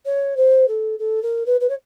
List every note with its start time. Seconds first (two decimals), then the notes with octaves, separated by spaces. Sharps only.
0.06 C#5
0.37 C5
0.68 A4
0.99 A4
1.23 A#4
1.46 B4
1.61 B4
1.69 C#5